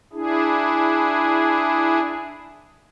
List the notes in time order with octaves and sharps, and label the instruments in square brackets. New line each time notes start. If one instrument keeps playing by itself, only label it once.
[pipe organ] D4 E4 G#4